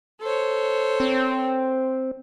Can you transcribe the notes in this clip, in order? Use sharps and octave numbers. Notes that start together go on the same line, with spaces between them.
A4 C5 C#5
C4